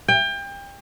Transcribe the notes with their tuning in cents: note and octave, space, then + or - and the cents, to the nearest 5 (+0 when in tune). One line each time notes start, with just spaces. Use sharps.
G5 +30